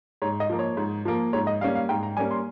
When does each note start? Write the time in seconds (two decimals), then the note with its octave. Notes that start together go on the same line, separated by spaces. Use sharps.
0.22 G#2 C#5
0.40 D#5
0.49 F3 A#3
0.59 C#5
0.77 G#2
1.05 F3 A#3
1.33 G#2 C#5
1.47 D#5
1.61 G3 A#3 C#4 F5
1.75 F5
1.89 G#2 G5
2.03 A#5
2.17 G3 A#3 C#4 G#5
2.31 C6